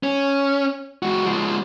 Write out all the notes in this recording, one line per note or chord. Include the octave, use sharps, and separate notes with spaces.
C#4
G#3 F#4
F3 G#3